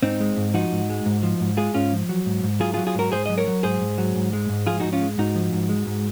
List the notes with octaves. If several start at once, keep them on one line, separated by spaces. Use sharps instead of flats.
G#2 C4 D#4
G#3
G#2
F3 D#4 F#4
G#2
G#3
G#2
F3
G#2
G#3 F4 G#4
G#2 C#4 F4
F3
F#3
G#2
G#2
F#3 F4 G#4
F#3 F4 G#4
F4 G#4
G#2 F#4 A#4
G#2 G#4 C5
F#3 D#5
A#4 C#5
F#3
G#2 G#4 C5
G#2
F#3
G#2
G#3
G#2
F3 F4 G#4
G#2 D#4 F#4
C#4 F4
G#3
G#2 D#4 F#4
F3
G#2
G#3
G#2